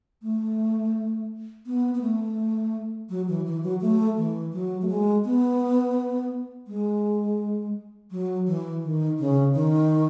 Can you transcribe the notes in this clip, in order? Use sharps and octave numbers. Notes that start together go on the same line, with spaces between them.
A3
B3
B3
A3
F#3
E3
E3
F#3
A3
E3
F#3
A3
G#3
B3
G#3
F#3
E3
D#3
C#3
D#3